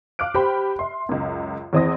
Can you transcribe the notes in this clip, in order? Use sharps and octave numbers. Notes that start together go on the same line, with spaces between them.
F5 D6 F6 F#6 D7
G4 C5 B5
E5 C6
C#2 F#2
E2 E3 C4 D#5 D#6 A#6